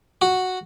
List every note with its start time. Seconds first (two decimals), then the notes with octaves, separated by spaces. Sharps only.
0.22 F#4